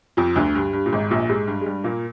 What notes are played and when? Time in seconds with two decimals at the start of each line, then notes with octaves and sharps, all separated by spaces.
0.17 F2 F3
0.36 D2 D3
0.55 G2
0.73 G2
0.86 A#2
0.92 G#1 G#2
1.11 A#1 A#2
1.29 G#2 G#3
1.47 G2 G3
1.61 G#3
1.66 G2 G3
1.84 A#2 A#3